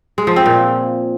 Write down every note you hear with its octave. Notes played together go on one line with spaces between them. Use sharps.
G#3
F3
C4
A#2